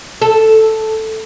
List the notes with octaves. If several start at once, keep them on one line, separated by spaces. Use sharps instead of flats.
A4